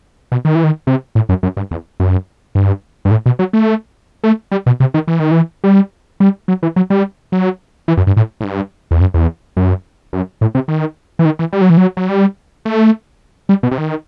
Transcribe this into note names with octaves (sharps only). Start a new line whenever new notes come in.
B2
D#3
E3
D#3
C3
A2
F#2
F#2
G2
E2
F#2
G2
G2
A2
B2
F#3
A3
A3
G3
B2
C3
D#3
E3
D#3
E3
G3
G3
F#3
E3
F#3
G3
F#3
E3
F#2
G2
A2
A2
G2
E2
F#2
E2
F#2
F#2
A2
C3
D#3
E3
D#3
E3
G3
F#3
E3
F#3
F#3
G3
A3
G3
B2
C3
D#3